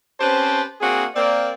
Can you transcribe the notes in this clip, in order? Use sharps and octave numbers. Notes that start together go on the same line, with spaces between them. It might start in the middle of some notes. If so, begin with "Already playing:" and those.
C4 C#4 G4 B4 C5 A5
A#3 C4 D4 F#4 G#4
A#3 C4 D5